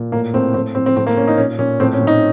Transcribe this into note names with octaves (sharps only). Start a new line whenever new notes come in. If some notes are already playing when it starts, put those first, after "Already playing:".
Already playing: A#2
A2 A#3
A2 C4
A2 C4
A2 C4
C4
A2 C4
A#3
A2 C#4
D#4
A#2 C#4
A#2 C#4
A2 C4
C#4
A2
D#4